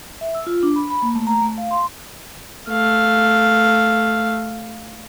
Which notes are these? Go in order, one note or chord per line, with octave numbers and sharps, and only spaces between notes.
E5
E6
F4
D4
B5
B5
A#3
A3
A#5
A3
F5
C6
A3 F5